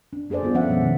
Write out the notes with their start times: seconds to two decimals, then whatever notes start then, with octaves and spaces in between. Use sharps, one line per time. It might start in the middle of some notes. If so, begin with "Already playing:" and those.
0.13 D4
0.30 A#3 G#4 A4 C5 D5
0.43 G3 B3 F4
0.54 F3 C#4 E5 F#5
0.70 B2 F3 G#3 A#3 B3
0.83 D#3